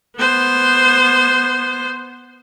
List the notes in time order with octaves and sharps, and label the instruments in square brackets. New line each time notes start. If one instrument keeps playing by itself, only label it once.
[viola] B3 C5